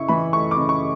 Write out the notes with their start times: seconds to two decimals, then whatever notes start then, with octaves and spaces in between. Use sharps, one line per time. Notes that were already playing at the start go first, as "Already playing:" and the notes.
Already playing: C#3 E4 C#6
0.08 E3 B5
0.33 A3 C#6
0.51 D6
0.57 C#3
0.69 C#6